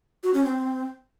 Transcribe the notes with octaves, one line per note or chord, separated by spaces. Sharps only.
F#4
C#4
C4